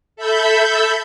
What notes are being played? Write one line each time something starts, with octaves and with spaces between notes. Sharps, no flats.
A4 E5 B5 G6